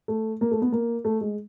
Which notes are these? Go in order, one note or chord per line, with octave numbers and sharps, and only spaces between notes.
A3
A#3
A3
B3
A#3
A3
G#3